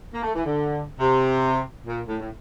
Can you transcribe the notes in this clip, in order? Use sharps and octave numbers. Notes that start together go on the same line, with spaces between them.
A#3
A3
E3
D3
C3
A#2
A2
A2